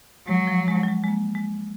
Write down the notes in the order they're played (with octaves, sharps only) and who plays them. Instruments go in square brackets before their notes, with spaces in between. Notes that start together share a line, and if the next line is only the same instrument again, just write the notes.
[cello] F#3 [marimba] G#3
[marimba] F3
G#3
F#3
G#3
G#3
A#3
G#3